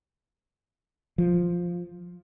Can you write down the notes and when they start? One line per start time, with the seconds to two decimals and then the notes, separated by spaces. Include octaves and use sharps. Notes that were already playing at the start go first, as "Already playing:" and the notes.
1.18 F3